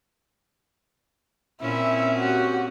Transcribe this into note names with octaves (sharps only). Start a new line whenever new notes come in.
A#2 C4 C#4 E4 E5
F#4 G4